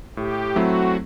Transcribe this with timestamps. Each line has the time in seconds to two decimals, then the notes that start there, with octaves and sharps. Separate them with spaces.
0.17 A2 G4
0.56 F#3 A3 C4 E4 F#4